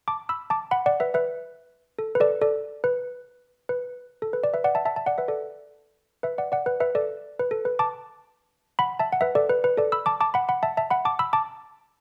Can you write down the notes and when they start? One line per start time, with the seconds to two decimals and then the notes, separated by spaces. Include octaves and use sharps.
0.08 A5 D6
0.29 B5 E6
0.50 A5 D6
0.71 F#5 B5
0.86 D5 F#5
1.00 B4 E5
1.14 B4 E5
1.99 A4
2.15 B4
2.20 A4 D5
2.41 A4 D5
2.84 B4
3.69 B4
4.22 A4
4.33 B4
4.44 D5
4.54 B4 E5
4.64 D5 F#5
4.75 E5 A5
4.85 E5 A5
4.96 E5 A5
5.06 D5 F#5
5.18 B4 E5
5.28 A4 D5
6.23 B4 E5
6.38 D5 F#5
6.52 D5 F#5
6.66 B4
6.80 B4 E5
6.95 A4 D5
7.39 B4
7.51 A4
7.65 B4
7.79 A5 D6
8.79 F#5 B5
9.00 E5 A5
9.12 F#5
9.21 B4 E5
9.35 A4 D5
9.49 B4
9.64 B4
9.77 A4 D5
9.92 B5 E6
10.06 A5 D6
10.21 A5 D6
10.34 F#5 B5
10.49 F#5 B5
10.63 E5 A5
10.77 E5 A5
10.90 F#5 B5
11.05 A5 D6
11.19 B5 E6
11.33 A5 D6